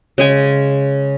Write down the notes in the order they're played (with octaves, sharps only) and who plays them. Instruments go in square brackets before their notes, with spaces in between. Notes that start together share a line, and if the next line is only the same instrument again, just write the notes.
[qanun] C#3 G#3 G#5